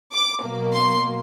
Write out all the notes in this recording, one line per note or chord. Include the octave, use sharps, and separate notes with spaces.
D6
B2 F#3 A#3
C6